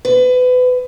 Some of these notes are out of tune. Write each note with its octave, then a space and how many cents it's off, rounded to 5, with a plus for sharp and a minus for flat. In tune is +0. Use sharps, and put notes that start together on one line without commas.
B4 +30